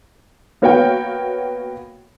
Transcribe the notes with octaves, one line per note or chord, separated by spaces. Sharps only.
A#3 B3 F#4 C#5 F5 G5